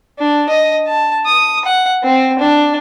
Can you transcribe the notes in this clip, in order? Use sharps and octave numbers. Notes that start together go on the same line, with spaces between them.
D4
D#5
A5
D#6
F#5
C4
D4